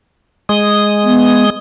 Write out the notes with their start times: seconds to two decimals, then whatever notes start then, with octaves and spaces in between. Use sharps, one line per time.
0.49 G#3 D#6
1.04 B3